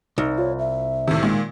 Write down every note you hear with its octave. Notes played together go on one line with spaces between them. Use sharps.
C2 D#4
F4 C#5
E5
A2 C3 D#3
A#2 D#3 G#3